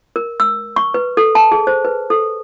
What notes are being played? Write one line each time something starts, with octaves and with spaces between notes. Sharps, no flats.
A#4
E6
C#6
B4
A4
A5
G#4
C5
B4
A4